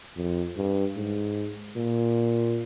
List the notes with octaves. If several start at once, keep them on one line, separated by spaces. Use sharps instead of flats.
F2
G2
G#2
A#2